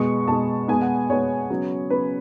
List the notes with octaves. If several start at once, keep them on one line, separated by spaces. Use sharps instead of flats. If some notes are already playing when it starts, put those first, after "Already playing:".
Already playing: B2 G#3 B3 C#6
B2 G#3 B3 A5
B2 G#3 B3 G#5
F#5
B2 G#3 B3 C#5
C#3 F#3 B3
C#3 F#3 B3 B4